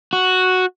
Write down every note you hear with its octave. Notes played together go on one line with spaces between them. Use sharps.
F#4